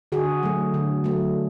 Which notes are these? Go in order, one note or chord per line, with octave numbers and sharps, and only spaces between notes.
D3 F#4 G#4
F#3 A3
D3
F#3 A3